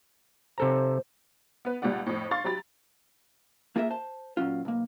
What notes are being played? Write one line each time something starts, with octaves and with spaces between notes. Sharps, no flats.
C3 A4 C5 A#5
B3 B4
C#2 A#2 G3 D5 F#5
F2 A2
F5 C6 C#6 A6
F#3 G4 B5 A6
A#3 F4 G#4 A#4 D5 E5
C5 A5
A#2 F#3 C#4 F4
B1 A#3